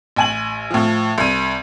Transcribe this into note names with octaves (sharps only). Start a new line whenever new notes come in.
A1 G#5 F#7
A2 F3
C2 D#7